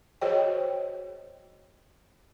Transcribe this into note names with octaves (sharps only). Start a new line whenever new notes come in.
F#4 G#4 C5 C#5 D#5 G5